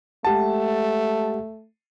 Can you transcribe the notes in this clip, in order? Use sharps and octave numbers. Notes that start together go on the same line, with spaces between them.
G#3 A3 G4 F#5 A5